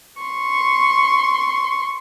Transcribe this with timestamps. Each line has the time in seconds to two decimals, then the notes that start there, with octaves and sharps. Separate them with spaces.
0.21 C6 C#6